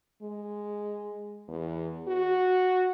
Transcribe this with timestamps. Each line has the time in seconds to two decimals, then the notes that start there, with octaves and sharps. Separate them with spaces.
0.22 G#3
1.48 E2
2.07 F#4